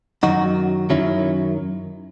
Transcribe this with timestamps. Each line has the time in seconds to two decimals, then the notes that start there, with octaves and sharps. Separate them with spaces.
0.23 F#2 D#3 F#3 D#4 F#4
0.90 F#2 D#3 F#3 C#4 E4